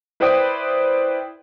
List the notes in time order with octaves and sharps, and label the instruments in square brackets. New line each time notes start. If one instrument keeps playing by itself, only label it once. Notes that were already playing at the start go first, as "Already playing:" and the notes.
[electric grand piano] E4 B4 C5 D5 G5 D#6